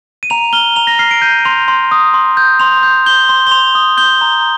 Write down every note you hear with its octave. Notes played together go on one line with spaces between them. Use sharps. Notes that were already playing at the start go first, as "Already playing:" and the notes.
D#7
A#5 F7
F6 G7
A#5 F7
A#6
F6 C7
D7
G6 D#7
C6 F7
C6
D#6
C6
G6
C6 F7
G6
G6 G7
C6
G7
C6 F7
D#6
G6 G7
A#5